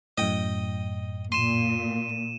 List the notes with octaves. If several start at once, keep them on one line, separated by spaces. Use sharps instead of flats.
F#2 A2 D#5 G5
A#2 C6 D#7 E7